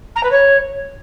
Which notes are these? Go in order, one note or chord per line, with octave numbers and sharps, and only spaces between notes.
A#5
B4
C#5